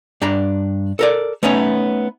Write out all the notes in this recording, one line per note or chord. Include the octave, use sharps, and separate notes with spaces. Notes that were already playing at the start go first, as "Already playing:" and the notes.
G2 D4 A#5
A4 A#4 D5
A3 B3 C#4 D#4 C#5